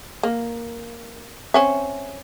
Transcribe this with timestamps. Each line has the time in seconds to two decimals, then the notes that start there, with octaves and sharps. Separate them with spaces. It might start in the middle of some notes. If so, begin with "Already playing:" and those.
0.23 A#3
1.54 C4 C#4 E5